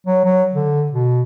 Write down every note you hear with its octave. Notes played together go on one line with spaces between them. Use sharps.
F#3
F#3
D3
B2